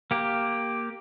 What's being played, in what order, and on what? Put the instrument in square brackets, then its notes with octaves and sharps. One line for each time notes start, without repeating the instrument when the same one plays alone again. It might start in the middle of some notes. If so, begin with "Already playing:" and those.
[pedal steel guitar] A#3 G4